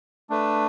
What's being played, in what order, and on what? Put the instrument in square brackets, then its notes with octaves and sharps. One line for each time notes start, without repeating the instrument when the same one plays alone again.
[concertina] A3 D4 B4